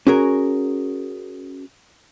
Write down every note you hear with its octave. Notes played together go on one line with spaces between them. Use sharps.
C#4 F#4 G#4 A#4